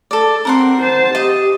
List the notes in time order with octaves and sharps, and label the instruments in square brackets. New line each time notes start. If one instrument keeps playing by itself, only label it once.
[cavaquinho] A4 D5
[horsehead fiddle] C4 [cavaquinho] A#4 F#5 C6
[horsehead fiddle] C5 A5
[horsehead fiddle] G4 [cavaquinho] D#5